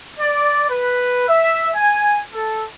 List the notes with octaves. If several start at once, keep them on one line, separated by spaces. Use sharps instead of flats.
D5
B4
E5
G#5
A4